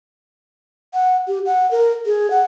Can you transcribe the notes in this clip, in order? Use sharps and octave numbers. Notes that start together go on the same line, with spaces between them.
F#5
G4
F#5
A#4
G#4
F#5